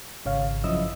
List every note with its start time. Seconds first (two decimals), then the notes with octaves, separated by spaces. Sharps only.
0.25 G#1 C#3 C#5 F5
0.64 F#2 C#3 F3 E4 D#5 E6